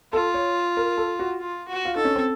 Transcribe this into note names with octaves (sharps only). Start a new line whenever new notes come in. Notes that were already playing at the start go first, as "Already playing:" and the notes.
F4 A4
C#5
A#4
A4
F#4
F4
F#4
F4
D#4 A4
C#4
C4